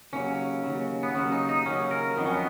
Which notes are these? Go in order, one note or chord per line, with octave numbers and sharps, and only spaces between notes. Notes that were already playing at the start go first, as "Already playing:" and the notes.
D#2 C#3 F#3 C#4
D#2 C#3 F#3
B3
D#2 C#3 F#3 C#4
D#4
D#4
D#2 C#3 F#3 C#4
A#4
F2 D#3 F#3 B3
C#4
B3